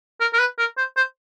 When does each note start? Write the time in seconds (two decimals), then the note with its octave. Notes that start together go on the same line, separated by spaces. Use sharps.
0.20 A#4
0.33 A#4
0.39 B4
0.59 A#4
0.78 C5
0.97 C5